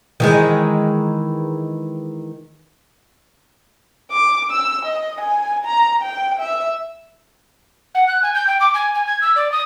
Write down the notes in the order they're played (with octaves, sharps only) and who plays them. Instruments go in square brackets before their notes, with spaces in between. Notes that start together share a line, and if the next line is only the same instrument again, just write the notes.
[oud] D#3 E3 G#3
[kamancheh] D6
E6
D#5
G#5
A#5
G5
E5
[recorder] F#5
F#6
G#5
G6
G5
D6
G#5
G#5
G#6
E6
D5
D#6